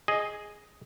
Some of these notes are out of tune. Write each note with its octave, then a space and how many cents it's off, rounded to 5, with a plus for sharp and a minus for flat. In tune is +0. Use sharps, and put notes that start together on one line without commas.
G#4 +0 D#5 +0